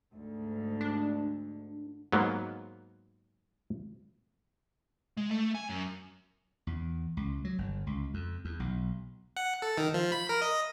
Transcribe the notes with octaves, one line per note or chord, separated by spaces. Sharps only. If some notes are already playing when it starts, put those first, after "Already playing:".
D2 G#2 D3
D4
G#2 F#3 A#3 B3
G#3
A3
G#5
F#2
E2
C#2
F#3
G1
C#2
F2
E2
B1
F#5
A4
D#3
F3
B5
A#4
D#5